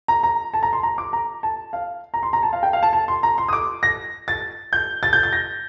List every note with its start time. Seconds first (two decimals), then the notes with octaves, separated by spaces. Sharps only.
0.08 A#5
0.23 A#5
0.54 A5
0.63 A#5
0.73 C6
0.83 A#5
0.98 D6
1.13 A#5
1.43 A5
1.73 F5
2.14 A#5
2.23 C6
2.33 A#5
2.43 A5
2.53 F5
2.63 G5
2.73 F5
2.83 A5
2.93 A5
3.08 C6
3.23 A#5
3.38 C6
3.48 D#6
3.53 D6
3.83 A#6
4.28 A6
4.73 G6
5.03 A6
5.13 G6
5.23 A6
5.33 A#6